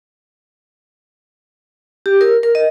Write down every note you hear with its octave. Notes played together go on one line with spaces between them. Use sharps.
G4
A#4
A#4
D#5